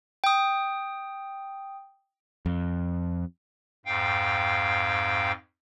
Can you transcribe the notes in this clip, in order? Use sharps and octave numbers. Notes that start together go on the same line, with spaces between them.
G5 D#6
F2
F2 G#2 F5 G5